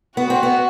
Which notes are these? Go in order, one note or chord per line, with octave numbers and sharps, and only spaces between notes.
B3 F#4
C4
B3